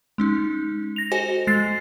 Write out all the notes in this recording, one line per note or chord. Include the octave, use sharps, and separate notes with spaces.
G#3 C#4 D#4
A#6 F7
F#4 A4 C5 D#5 G#5
G#3 A6 C7